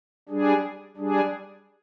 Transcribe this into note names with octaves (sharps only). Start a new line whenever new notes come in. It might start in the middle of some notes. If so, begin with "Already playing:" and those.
G3 D4 G#4
G3 D4 G#4